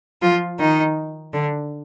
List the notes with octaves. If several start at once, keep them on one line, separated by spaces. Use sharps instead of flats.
F3 F4
D#3 D#4
D3 D4